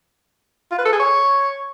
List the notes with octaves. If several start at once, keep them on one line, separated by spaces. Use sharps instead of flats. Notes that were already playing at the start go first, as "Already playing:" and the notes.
F4
B4
A4
G#4
C#5